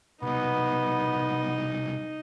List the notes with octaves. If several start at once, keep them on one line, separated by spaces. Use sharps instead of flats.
C2 B2 B3 D#4